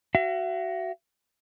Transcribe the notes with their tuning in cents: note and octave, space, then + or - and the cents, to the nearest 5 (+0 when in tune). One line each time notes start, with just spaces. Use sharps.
F#4 +20 E5 +45